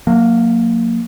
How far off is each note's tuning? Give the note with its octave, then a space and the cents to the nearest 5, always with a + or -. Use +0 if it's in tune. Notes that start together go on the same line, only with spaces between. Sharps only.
F#3 -35 A#3 -10